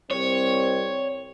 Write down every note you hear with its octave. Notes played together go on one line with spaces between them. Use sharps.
C2 G3 C4 C#5